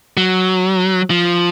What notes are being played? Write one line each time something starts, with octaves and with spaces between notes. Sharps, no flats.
F#3
F3